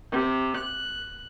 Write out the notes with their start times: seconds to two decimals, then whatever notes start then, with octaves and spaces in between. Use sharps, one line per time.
0.11 C3
0.57 F#6